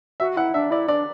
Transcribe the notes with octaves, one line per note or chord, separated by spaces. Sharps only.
F#4 E5
E4 F#5
D4 E5
E4 D5
D4 D5